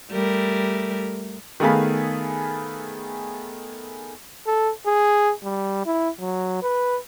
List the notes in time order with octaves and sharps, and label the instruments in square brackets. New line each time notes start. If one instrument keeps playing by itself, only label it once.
[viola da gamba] G3 A3 A#4
[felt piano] D#3 A3 B3 G#4 F5 B5
[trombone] A4
G#4
G3
E4
F#3
B4